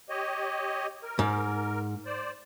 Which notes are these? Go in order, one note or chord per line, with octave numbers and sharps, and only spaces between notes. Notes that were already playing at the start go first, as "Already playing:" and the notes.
G4 C#5 D#5
A#4
G#2
C5 D5